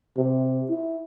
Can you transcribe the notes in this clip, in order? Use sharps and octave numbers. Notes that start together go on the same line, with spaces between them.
C3
E4